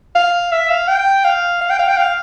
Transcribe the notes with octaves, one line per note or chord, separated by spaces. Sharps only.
F5
E5
F5
G5
F5
F5
G5
F5
G5
F5